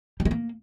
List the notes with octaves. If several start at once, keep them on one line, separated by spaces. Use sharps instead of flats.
G3
G#3
A#3